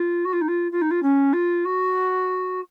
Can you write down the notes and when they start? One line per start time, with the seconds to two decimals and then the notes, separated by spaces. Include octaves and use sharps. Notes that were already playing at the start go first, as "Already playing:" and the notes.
Already playing: F4
0.25 F#4
0.33 F4
0.41 D#4
0.48 F4
0.71 F4
0.81 D#4
0.90 F4
1.02 C#4
1.33 F4
1.65 F#4